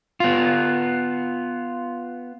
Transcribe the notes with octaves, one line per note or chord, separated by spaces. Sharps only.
B3 F4